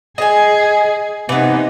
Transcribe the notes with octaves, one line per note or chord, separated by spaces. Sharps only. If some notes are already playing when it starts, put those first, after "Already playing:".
G#4 D#5 G#5
C3 E3 B3 D#4